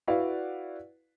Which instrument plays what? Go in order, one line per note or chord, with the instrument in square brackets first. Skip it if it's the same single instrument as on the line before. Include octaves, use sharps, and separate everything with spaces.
[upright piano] E4 F#4 B4 D5 F5 F#5